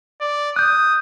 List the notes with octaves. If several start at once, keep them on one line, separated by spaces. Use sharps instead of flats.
D5
D#6 F#6 G6